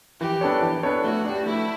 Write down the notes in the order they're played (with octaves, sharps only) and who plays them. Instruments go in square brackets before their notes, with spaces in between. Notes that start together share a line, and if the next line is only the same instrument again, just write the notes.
[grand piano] E3 [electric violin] G4
[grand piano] B3 D4 A4 C#5
E3
B3 D4 A4 C#5
[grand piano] A3 [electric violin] F#4
[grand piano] D4 G4
[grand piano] A3 [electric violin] E4